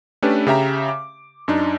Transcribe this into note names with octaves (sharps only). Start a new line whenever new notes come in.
A3 C#4 D4 G4 A4 B4
C#3 G4 E5 A#5
D6
F#2 D4 D#4